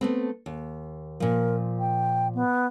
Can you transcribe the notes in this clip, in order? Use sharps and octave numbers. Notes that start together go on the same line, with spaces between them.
A3 B3 C4
D#2
A#2 F3 A#4
G5
B3